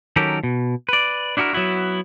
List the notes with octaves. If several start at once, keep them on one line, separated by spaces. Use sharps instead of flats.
D#3 F#3 C#4 G4 A4 A#4
B2
B4 D5
D4 E4 F#4 G4 A#4
F#3 B3 E4 F#4